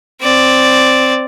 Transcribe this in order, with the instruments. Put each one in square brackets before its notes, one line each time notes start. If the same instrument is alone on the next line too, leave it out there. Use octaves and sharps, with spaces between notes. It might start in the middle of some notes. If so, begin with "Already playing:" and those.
[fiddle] C4 D5